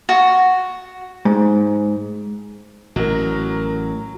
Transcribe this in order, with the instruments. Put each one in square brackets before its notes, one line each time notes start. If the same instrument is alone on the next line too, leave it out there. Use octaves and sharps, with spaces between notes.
[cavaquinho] F#4
[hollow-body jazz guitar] G#2
[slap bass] A1 [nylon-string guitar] F#3 [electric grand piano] F#4 A#4